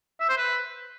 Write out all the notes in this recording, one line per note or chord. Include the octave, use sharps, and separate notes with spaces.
E5
C5
B4